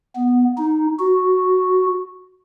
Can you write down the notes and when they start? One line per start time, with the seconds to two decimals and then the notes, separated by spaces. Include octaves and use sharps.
0.16 B3
0.58 D#4
0.99 F#4